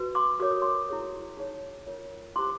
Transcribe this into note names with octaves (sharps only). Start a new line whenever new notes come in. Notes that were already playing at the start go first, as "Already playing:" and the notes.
Already playing: F#4 B4
C6 D6
F#4 A#4 C#5 D6
D#6
C6 D6
E4 G#4 C#5
D#4 G#4 C#5
F4 A#4 C#5
E4 G4 C5 C6 D6